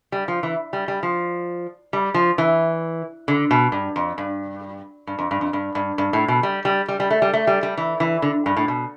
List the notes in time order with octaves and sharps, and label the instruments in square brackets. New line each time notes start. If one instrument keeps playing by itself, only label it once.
[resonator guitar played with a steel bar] G3
F3
E3
G3
G3
F3
G3
F3
E3
D3
B2
G2
F2
G2
G2
F2
G2
F2
G2
G2
G2
A2
B2
G3
G3
G3
G3
A3
G3
A3
G3
G3
E3
E3
D3
G2
A2
B2